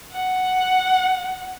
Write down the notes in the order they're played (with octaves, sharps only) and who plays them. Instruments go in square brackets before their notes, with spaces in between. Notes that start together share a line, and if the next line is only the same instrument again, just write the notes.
[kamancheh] F#5